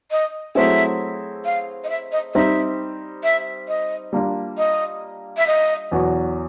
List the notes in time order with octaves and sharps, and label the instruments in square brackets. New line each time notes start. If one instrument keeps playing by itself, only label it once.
[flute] D#5
[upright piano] F#3 A3 C4 E4 G#4 [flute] E5
[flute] F5
D#5
E5
D#5
[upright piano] G3 C4 D#4 [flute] E5
[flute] E5
D#5
[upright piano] G3 A#3 D4 F4
[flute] D#5
E5
D#5
[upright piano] E2 B2 F#3